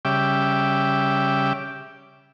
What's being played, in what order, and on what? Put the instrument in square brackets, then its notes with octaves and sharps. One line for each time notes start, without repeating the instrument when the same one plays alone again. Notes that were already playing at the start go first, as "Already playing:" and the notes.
[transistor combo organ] C#3 G3 E5 G5 D6